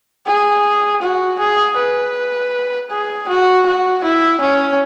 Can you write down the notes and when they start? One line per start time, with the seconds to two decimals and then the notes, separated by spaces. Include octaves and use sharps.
0.27 G#4
1.02 F#4
1.39 G#4
1.77 B4
2.90 G#4
3.28 F#4
3.66 F#4
4.04 E4
4.41 C#4